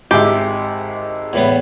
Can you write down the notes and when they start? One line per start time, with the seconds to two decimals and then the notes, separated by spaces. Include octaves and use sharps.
0.11 G#1 G#3 G4 E5
1.33 E2 A2 B3